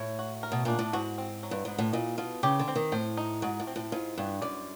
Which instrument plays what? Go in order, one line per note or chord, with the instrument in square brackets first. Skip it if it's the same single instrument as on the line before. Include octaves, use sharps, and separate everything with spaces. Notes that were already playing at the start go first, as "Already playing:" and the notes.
Already playing: [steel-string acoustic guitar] A2 [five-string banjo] C#5
[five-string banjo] F#4
A#4
[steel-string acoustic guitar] B2
[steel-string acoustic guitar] A#2 [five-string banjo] D4
[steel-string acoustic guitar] A2
[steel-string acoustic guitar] G#2 [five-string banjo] F#4
[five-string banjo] C4
F#3
[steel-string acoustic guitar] G2
[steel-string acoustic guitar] G#2 [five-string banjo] B3
[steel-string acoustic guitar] A2
[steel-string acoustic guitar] A#2 [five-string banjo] D#5
[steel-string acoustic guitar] B2 [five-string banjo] F4
[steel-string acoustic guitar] C#3 [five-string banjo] G4
[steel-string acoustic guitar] D3
[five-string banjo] C4
[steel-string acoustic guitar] D#3
[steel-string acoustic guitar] A2 [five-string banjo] C5
[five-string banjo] D#4
[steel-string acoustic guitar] G#2 [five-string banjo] F#4
[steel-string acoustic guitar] A2
[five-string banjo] C4
[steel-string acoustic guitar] A2
[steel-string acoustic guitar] G#2 [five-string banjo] F4
[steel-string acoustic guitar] G2 [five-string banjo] B3
[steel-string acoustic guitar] F#2 [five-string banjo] D5